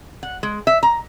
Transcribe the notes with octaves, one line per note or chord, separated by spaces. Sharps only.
F#5
G#3
E5
A#5